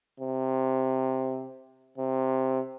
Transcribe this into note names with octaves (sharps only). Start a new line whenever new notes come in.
C3
C3